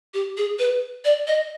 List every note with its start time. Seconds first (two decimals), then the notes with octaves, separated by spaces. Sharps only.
0.14 G4
0.37 G#4
0.59 B4
1.05 D5
1.27 D#5